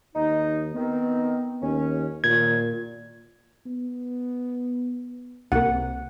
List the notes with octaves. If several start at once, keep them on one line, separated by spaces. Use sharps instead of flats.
D#2 D#4
D#3 B3 C4
D#2 C#4
D#2 A#2 D#3 G#6
B3
C2 C3 A#3 F#5